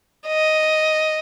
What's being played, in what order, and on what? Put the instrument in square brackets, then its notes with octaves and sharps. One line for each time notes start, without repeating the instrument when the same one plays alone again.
[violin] D#5